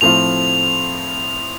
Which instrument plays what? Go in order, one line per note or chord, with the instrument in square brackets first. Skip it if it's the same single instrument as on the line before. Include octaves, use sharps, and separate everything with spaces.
[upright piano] A2 F3 C4 F4 [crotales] F7